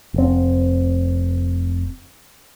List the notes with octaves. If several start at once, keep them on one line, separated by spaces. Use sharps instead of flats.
F1 C4